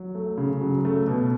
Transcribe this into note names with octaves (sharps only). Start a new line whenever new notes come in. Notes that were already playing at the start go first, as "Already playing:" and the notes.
Already playing: F#3
A3
C#3
F#3
A3
B2